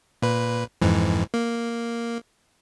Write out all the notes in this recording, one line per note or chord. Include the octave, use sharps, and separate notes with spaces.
A#2 B4
F2 G#2 E3
A#3